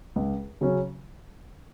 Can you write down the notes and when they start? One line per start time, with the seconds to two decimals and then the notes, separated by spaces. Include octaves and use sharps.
0.16 C#2
0.61 C#3 F#3 C#4